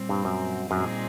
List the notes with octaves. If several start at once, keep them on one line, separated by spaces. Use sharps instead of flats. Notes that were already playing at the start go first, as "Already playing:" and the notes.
Already playing: A#2 G3 C4
G2
F#2
F#2 A#2 G3 C4 D#4 G#4